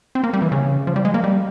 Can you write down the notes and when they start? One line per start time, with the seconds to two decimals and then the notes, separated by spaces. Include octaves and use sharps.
0.15 C4
0.24 A#3
0.33 G3
0.42 E3
0.52 C#3
0.87 F3
0.96 G3
1.05 G#3
1.14 A#3
1.24 G3